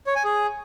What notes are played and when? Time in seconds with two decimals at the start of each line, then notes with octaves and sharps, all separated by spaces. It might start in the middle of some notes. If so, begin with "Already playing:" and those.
0.07 C#5
0.16 G#5
0.24 G#4